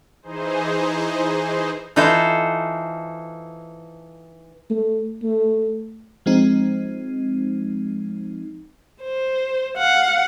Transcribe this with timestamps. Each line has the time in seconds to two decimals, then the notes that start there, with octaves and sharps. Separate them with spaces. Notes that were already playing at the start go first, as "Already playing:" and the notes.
0.22 E3 D#4 G#4 C5
1.96 E3 D#4 F4 A4 C5
4.70 A3
5.22 A3
6.26 F3 G#3 C4 D#4
9.03 C5
9.78 F5 F#5